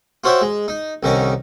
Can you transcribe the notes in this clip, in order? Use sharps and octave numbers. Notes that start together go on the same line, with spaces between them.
F4 F#4 C5 C#5 E5 G5
G#3
D#4
C2 D3 D#3 C#4 A#5